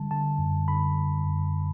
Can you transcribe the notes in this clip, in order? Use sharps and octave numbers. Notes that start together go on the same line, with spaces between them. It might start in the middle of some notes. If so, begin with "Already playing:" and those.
Already playing: D3 G3 A5
D3 A5
F#2
D3 B5
D3
F#2